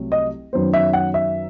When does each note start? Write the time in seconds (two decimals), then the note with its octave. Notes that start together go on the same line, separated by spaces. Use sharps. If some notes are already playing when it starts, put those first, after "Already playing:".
Already playing: C2 C3 F#3 A3
0.12 D#5
0.53 F#2 D#3 F#3 B3 C5
0.73 E5
0.93 F#5
1.14 E5